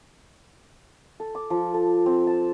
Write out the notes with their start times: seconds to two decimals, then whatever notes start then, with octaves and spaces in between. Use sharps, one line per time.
1.20 A4
1.35 D6
1.50 F3
1.74 A4
2.06 C4
2.27 A5